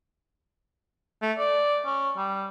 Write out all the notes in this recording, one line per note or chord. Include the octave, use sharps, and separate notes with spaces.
A3
D5
C#4
G3